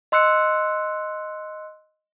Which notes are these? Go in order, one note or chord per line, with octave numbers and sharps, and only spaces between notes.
D#5 C6 E6 F#6 C#7